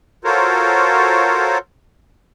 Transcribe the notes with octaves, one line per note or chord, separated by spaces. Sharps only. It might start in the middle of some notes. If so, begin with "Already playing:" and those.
F4 F#4 A4 A#4 C5 C#5